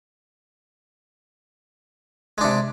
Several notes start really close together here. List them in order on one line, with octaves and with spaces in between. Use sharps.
G#3 D4 C3